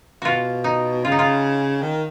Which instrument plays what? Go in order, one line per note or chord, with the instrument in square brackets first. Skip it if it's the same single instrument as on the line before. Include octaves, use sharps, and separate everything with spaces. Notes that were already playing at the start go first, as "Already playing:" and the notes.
[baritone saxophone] B2 [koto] F4 F#4
[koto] D#4
[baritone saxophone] C#3 [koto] F4
[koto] D#4
F4
[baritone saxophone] D#3